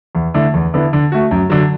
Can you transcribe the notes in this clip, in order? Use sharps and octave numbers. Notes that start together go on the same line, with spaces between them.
E2
D3 A3 E4
E2
D3 B3 E4
D3
A3 F#4
F#2
D3 F#3